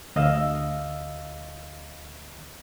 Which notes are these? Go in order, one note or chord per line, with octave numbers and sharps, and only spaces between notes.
D2 D#5 F5 E6